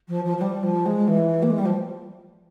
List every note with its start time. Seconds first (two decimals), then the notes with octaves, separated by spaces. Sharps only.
0.08 F3
0.24 F3
0.37 F3
0.41 G3
0.63 F3
0.85 G#3
1.07 E3
1.42 A#3
1.50 G#3
1.58 G3
1.65 F3